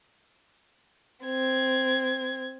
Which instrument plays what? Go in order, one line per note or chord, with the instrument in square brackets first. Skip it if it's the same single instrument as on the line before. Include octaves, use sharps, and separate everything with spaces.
[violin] C4 G#6